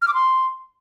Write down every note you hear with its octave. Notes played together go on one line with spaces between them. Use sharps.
F6
D6
C6